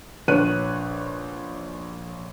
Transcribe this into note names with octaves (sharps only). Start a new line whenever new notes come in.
A#1 B4 C#5 F#6 D#7